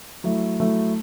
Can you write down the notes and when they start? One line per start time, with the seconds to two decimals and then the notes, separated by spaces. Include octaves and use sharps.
0.24 F#3 A3 E4
0.60 F#3 A3 E4